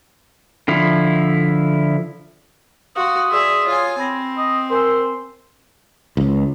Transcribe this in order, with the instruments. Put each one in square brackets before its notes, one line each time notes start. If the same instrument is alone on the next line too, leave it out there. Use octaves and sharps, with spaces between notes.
[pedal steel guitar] D3 F3 E4
[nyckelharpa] F#4 [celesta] F5 C6 [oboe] D#6
[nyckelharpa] G#4 E5 [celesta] D5 C6
[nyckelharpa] F4 G#5 [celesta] C#5
[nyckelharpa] C4 [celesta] B5 A#6
[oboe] D#5
[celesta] A#4 G#5 E6 [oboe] C5
[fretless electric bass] C#2